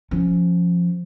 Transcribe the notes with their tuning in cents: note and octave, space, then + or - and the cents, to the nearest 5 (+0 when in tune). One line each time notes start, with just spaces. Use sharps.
F3 +0 C#4 +0